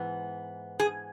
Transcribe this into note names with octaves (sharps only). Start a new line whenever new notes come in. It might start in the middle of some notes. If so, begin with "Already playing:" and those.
Already playing: G#2 E3 B3
G#4